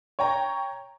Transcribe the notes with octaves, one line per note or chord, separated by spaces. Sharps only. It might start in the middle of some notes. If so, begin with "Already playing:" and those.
C#5 G5 A#5